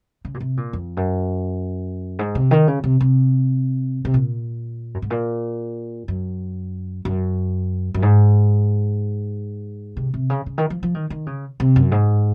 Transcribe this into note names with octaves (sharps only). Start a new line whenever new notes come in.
C#3
A#2
C3
A#2
F2
F#2
G#2
C3
D#3
C#3
C3
C3
C3
A#2
F#2
G#2
A#2
F#2
F#2
F#2
G#2
C3
C3
C#3
C#3
D#3
F3
F3
D#3
D#3
C#3
C3
F#2
G#2